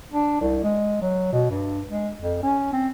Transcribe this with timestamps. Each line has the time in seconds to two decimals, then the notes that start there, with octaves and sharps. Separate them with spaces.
0.13 D4
0.41 C2
0.64 G#3
1.02 F#3
1.32 B2
1.50 G2
1.88 G#3
2.20 F2
2.43 C#4
2.73 C4